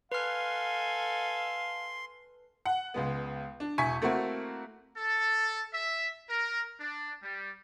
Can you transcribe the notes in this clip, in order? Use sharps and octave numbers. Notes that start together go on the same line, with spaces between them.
A4 B4 F5 G#5 C6 F6
F#5
C#2 G#3 B3
D4
E1 E4 G#5 C#6 B6
A3 A#3 C4 E4 F#4
A4
E5
A#4
D4
G3